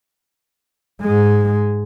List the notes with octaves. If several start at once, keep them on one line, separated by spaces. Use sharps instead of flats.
G#2 G#3